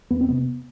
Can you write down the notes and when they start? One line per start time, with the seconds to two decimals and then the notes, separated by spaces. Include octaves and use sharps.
0.10 E2 B3
0.21 C4
0.29 C3 B3